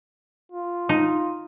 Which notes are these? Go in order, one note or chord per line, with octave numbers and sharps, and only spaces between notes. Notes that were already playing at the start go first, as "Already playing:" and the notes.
F4
D#4